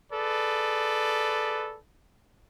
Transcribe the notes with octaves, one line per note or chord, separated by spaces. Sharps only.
G#4 A4 B4 D5